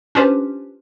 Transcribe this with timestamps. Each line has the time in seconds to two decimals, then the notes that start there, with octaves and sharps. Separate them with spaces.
0.15 C#4 D4 F4 G4 B4 C5